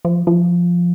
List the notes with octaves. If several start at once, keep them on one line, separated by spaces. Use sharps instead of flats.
F3
F3